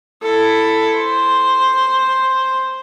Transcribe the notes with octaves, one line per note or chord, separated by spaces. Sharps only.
E4 A4
C5